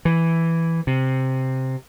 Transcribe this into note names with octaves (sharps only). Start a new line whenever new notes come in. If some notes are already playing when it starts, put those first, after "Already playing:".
E3
C3